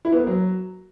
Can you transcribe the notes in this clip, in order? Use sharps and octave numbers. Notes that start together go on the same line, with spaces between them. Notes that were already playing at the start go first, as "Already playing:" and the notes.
E4
B3
A#3
F#3